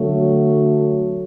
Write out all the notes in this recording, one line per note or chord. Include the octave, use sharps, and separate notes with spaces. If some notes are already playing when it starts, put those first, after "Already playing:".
Already playing: D3 F#3 A3